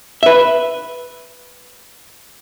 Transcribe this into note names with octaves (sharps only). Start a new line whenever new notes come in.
B4 E5